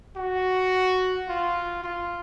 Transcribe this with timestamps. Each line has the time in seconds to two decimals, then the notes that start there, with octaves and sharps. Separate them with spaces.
0.17 F#4
1.29 F4
1.84 F4